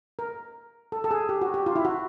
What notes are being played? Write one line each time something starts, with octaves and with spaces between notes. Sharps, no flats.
A#4
A4
A4
G#4
G4
F#4
G4
F4
E4
F#4